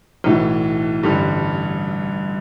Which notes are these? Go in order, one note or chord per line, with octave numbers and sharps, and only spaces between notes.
B1 A2 E3
A1 G2 D3 G3